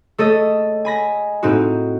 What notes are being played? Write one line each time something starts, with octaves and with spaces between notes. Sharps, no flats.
A3 A4 C#5 D#5
G#5 B5 A#6
A2 C4 D#4 F#4